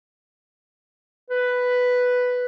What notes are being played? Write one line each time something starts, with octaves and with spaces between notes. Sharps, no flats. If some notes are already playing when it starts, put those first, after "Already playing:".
B4